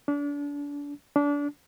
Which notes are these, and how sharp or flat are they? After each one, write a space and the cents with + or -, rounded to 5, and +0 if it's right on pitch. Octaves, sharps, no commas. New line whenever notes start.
D4 -35
D4 -30